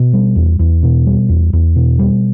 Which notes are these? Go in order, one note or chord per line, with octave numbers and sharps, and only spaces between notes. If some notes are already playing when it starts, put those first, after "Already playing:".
Already playing: B2
G3
E2
E2
B2
G3
E2
E2
B2
G3